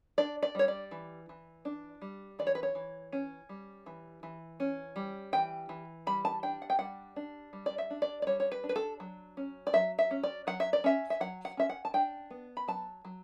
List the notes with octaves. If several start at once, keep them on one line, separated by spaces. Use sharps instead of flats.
D4 D5
D5
G3 C#5
D5
E3
E3
D4
G3
E3 D5
C#5
B4
C#5
E3
C#4
G3
E3
E3
C#4
G3
E3 G5
E3
G3 B5
A5
D4 G5
F#5
G5
G3 F#5
D4
G3
D5
E5
D4
D5
D5
G3 C#5
C#5
B4
D4
B4
A4
F#3
C#4
D5
F#3 E5
E5
C#4
D5
F#3 F#5
E5
D5
C#4 E5
E5
F#3 F#5
F#5
C#4 E5
F#5
A5
D4 G5
B3
B5
F#3 A5
F#3